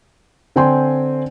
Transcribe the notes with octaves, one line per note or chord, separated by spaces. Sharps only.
D3 C4 G5 G#5 C6